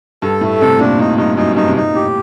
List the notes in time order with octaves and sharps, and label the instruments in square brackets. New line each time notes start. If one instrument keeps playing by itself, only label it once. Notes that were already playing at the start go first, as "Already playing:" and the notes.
[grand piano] G2 [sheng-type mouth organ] A4
[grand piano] A2 [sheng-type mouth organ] A3
[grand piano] C3 [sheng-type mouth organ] A4
[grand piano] A#2 [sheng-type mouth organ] D4
[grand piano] A2 [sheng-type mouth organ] D#4
[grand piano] G2 [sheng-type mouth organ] D#4
[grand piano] F#2 [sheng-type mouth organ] D#4
[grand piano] G2 [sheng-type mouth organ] D#4
[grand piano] C3
[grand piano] A#2 [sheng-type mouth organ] D#4
[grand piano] A2 [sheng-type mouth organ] G4